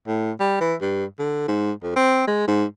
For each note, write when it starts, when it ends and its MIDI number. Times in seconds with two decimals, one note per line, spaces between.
0.08 0.32 45
0.40 0.58 55
0.61 0.75 52
0.81 1.05 43
1.19 1.43 50
1.48 1.72 44
1.83 1.93 41
1.96 2.24 60
2.27 2.44 56
2.48 2.65 44